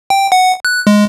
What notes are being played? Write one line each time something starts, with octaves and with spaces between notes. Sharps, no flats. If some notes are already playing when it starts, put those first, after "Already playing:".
G5
F#5
F#6
G#3